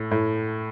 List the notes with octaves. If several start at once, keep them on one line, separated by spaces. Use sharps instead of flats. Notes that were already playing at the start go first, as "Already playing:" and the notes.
Already playing: A2
A2